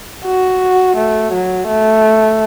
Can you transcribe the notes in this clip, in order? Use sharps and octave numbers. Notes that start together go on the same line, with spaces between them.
F#4
A3
F#3
A3